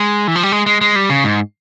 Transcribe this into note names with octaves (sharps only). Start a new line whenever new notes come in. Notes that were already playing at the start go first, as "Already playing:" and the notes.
Already playing: G#3
E3
F3
G3
G#3
G#3
G#3
G3
C#3
G#2